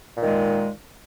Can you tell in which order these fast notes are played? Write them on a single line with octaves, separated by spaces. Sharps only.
A#2 D#3 G#3